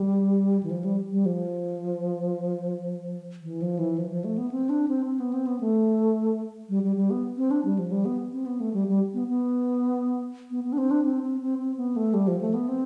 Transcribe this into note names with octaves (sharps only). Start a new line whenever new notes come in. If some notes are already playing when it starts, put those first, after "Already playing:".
Already playing: G3
E3
F3
G3
G3
F3
E3
F3
E3
F3
F3
A3
B3
C4
D4
C4
C4
B3
C4
B3
A3
G3
G3
G3
B3
C4
D4
G3
F3
G3
B3
C4
B3
A3
G3
G3
B3
B3
B3
B3
D4
C4
D4
C4
C4
C4
C4
B3
A3
G3
F3
A3
B3
C4